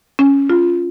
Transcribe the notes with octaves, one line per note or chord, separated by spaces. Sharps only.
C#4
F4